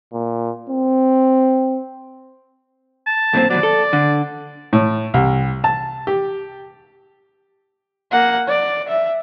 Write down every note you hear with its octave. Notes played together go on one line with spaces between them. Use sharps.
A#2
C4
A5
B1 A#2 C4
D#2 B2 F#3 D5
A4
D3
A2
C2
A5
G4
A#3 F#5
D5
E5